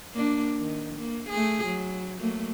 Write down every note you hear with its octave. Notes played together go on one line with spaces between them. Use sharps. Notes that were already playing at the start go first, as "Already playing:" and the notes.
A#3 D4
D#3
A#3
A3 G#4
F#3
F#3 A3 A#3